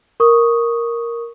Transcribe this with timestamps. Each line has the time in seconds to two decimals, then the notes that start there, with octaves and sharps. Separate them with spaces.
0.20 A#4 C#6 D#6